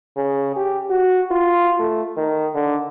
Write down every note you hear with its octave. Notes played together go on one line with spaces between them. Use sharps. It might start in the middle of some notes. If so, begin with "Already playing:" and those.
C#3
G4
F#4
F4
A3
D#3
D3